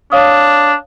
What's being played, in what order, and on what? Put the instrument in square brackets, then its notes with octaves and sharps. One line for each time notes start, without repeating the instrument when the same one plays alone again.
[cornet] D4 [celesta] C#5 F5 D#6